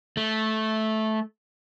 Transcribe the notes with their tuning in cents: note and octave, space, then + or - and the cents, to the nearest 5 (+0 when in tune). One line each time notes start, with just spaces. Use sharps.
A3 -10